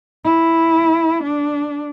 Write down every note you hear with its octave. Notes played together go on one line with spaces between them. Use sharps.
E4
D4